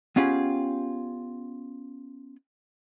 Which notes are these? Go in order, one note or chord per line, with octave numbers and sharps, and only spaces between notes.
B3 C#4 F4 G4 G#4